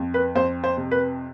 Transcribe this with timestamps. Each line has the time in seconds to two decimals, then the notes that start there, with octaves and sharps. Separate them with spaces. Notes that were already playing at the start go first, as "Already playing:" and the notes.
Already playing: F2
0.14 B4
0.35 F2 C5
0.64 C5
0.77 C3
0.91 B4